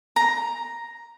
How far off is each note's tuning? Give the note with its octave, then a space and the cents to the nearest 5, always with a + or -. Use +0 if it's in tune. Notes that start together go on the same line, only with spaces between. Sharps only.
A#5 +5